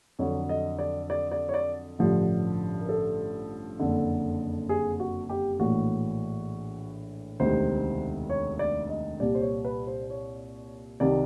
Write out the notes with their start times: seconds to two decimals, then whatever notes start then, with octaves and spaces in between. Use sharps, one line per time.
0.19 F2 D3 F#3 C#5
0.49 D#5
0.79 D5
1.10 D5
1.32 D5
1.49 C#5
1.54 D5
1.99 A1 G2 D3 F3
2.81 A#4
2.89 A4
3.79 F#1 F2 D3
4.69 G#4
5.00 F#4
5.29 G4
5.59 A#1 A2 E3 F#4
7.40 E1 D2 C3 D#3 C5
8.30 C#5
8.59 D5
8.89 D#5
9.19 C2 A#2 G3 D5
9.35 C5
9.41 C#5
9.65 B4
9.87 C5
10.10 C#5
11.00 C2 C3 D#3 G3 D5